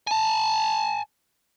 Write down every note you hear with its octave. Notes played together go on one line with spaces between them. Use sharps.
G#5 A5